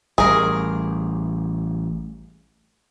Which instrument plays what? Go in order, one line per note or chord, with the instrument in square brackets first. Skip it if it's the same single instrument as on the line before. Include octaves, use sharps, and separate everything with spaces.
[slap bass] A1 G3 [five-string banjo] G#4 A#4